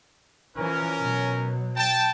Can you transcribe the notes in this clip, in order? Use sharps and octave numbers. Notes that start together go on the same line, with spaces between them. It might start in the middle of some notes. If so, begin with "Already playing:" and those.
E3 F3 C#4 A#4
B2 F#3
G5 A5